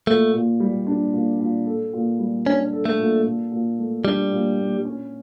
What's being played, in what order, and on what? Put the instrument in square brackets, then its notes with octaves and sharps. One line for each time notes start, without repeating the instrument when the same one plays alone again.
[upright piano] A#2 [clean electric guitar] A3
[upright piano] A#2
G3
D4
A#2
A#2
A4
A#2
G3
[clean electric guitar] C#4 [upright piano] D4
[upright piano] A4
[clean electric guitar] A3
[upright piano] A#2
A#2
A#2
A3
[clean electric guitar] G3 [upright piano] D4
[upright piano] A#2
A#2
C#4